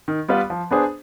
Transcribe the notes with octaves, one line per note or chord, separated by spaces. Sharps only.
D#3
G3 B3 F4 B4
F3
B3 D4 G#4 C5